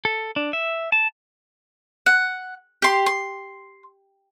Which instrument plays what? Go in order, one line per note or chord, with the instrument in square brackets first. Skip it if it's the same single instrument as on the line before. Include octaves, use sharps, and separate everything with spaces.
[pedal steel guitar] A4
D4
E5
A5
[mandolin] F#5
G4 C6
C6